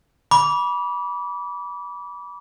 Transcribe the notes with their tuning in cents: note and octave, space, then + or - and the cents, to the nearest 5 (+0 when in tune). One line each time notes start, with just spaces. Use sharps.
B5 -25 D6 -25